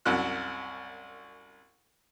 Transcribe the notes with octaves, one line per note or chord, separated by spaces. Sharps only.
C2 F#2 F#4 F#6